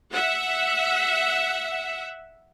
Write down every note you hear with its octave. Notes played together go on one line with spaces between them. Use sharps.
E5 F#5